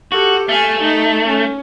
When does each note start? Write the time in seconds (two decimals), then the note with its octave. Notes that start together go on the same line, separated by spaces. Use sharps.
0.12 F#4 G4 A4
0.49 A3 F5 G#5
0.79 D#4
1.26 C#4